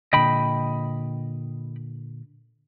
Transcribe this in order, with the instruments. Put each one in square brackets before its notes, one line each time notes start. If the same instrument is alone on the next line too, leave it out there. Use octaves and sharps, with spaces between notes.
[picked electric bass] A#2 D3 [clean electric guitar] D#5 G5 B5